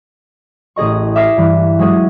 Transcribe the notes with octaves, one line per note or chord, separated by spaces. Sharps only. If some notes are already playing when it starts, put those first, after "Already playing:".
A1 C#4 G#4 D#5 C#6
E5 D6 F6 A#6 C7 E7
G2 E3
F#3 G#3 C#4 G#4